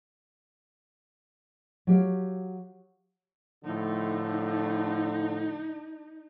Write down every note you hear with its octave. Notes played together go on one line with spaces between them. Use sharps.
F#3 G4 F5
A2 D3 F3 D#4